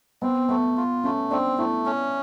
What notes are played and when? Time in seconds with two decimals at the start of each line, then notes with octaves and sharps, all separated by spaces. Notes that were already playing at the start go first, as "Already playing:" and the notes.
0.22 B3 C4
0.49 A3 B3
0.77 F4
1.04 A3 C#4
1.31 C4 D4
1.58 A3 E4
1.86 C#4